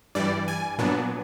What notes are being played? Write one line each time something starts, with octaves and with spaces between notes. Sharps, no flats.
G2 E3 G3 D5
G#5
A#2 F#3 B3 D4